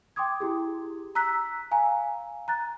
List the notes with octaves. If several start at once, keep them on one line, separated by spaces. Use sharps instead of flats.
G5 C6 D6 D#6 G#6
E4 G4 G#4
A#5 E6 F#6 B6
F5 G#5 A#5
A#5 F#6 A6